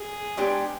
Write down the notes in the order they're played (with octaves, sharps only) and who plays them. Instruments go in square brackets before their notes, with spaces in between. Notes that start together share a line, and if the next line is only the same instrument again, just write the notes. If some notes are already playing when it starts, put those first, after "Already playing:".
Already playing: [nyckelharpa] G#4
[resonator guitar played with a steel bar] G#3 B3 D4 G4